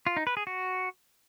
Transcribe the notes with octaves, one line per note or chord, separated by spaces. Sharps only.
F4
D#4
B4
G#4
F#4